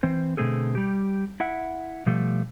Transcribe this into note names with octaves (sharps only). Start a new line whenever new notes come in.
E3 C4 C5
B2 D3 A3 C4 G#4 A4
G3 G4
E4 E5 F#5
B2 F3 G3 A3